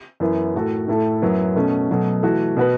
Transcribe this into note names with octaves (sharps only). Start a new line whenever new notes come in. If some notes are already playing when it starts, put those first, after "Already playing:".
F#2 E3 B3 E4
A2 A3 F#4 A4
A2 A3 E4 A4
F#2 F#3 B3 E4
B2 A3 C#4
B2 F#3 A3
E3 A3 F#4
B2 B3 F#4 B4